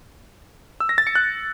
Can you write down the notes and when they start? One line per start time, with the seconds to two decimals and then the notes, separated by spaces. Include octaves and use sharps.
0.80 E6
0.89 A#6
0.98 A6
1.07 C#7
1.15 F#6